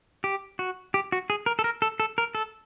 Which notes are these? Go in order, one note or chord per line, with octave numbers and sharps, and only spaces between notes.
G4
F#4
G4
F#4
G#4
A#4
A4
A#4
A4
A4
A#4
A4